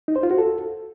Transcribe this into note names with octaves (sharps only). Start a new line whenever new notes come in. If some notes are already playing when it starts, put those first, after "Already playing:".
D#4
C5
F4
F#4
A4